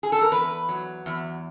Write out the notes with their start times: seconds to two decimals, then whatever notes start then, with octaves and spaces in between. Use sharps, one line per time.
0.03 G#4
0.12 A4
0.21 A#4
0.32 E2 B4
0.69 F#3
1.06 E2